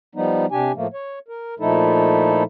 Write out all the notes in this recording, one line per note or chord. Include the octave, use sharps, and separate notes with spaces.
F3 G3 B3 D#4
C3 D4 G4 G#5
A2 F3 A3 A#3
C#5
A#4
A#2 F3 A3 D#4 E4 A4